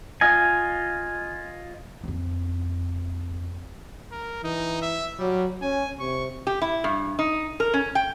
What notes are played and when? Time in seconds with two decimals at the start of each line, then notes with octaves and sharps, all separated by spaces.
0.21 F4 D#5 G#5
2.04 F2 C4
4.12 A#4
4.44 E3 D#4
4.82 E5
5.19 F#3 G3
5.62 C#4 G#5
6.00 C3 C#6
6.47 G4
6.62 E4
6.84 G2
7.19 D#4
7.60 A#4
7.74 C#4
7.95 G5